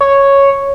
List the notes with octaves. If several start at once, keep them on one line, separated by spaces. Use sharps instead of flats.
C#5